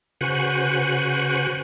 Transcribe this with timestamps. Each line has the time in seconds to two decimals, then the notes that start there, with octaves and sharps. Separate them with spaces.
0.21 C#3 F#4 B4 C5 F#5 G#5